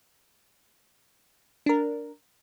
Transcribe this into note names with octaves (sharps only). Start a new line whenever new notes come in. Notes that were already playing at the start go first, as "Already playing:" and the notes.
D4 A#4